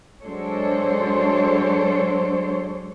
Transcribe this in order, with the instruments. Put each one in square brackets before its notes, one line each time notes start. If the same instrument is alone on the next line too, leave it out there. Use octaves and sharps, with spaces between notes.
[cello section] F#3 G#3 D4 A4 C5 C#5